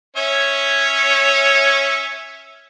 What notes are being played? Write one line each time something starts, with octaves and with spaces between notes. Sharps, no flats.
C#4 C#5 E5